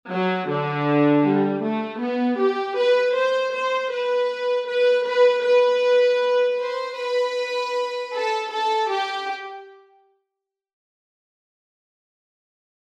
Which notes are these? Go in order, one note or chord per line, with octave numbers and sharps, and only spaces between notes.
F#3
D3
G3
A3
B3
G4
B4
C5
C5
B4
B4
B4
B4
C5
B4
A4
A4
G4